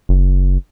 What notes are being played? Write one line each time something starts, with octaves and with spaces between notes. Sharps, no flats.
F#1